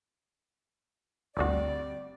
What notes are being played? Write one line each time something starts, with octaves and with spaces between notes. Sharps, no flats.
G1 D2 G3 C4 F#4 D5